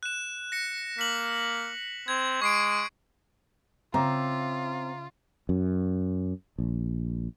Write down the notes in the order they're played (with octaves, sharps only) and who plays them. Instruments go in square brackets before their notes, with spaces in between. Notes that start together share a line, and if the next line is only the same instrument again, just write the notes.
[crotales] F#6 E7
A#6 C#7
[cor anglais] A#3 [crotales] B6 F#7
[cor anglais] C4 [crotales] G#6
[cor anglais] G#3 [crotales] C#6 C7 D7
[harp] C#3 E5 D6 [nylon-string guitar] C4 [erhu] F4 [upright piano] A#5
[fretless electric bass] F#2
A#1